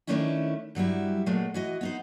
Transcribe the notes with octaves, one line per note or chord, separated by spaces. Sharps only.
D#3 E3 A3 C#4 D4 E4
G2 F#3 G3 E4
A#2 F#3 G#3 A3
E3 F#4 D#5
B3 D#4 C5